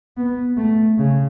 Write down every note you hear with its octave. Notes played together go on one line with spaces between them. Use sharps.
B3
A3
C#3